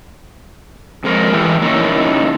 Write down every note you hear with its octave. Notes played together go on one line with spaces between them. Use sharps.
F2 G#3 A#4
A2 E3 E4 G4
D#3 A#3 C#4 D#4 E4 C#5